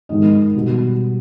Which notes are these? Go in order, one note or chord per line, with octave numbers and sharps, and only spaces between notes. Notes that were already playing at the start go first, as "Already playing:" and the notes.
G#2 D#3 G#3 D#5
B2 G3